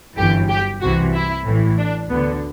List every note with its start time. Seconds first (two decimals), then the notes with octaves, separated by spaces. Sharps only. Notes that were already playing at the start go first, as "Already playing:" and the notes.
0.17 G1 F#2 E3 G4
0.49 G4
0.81 C2 C3 E3 F#4
1.13 E4
1.45 A1 A2 E3
1.78 D4
2.09 D2 D3 B3